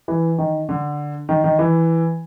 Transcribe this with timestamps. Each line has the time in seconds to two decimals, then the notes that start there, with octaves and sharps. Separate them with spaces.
0.08 E3
0.38 D#3
0.69 D3
1.29 D#3
1.44 D#3
1.59 E3